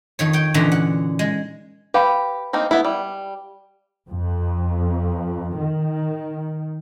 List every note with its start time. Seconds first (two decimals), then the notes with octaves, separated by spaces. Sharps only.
0.19 F2 D#3 C#5
0.33 C#5 G5
0.54 A#2 D3 E3 C#4 D#4 A#5
0.72 F#5
1.19 G#3
1.94 G4 B4 F5 B5
2.53 A#3 C4 D#4
2.71 B3 E4
2.85 G3
4.09 F2
5.58 D#3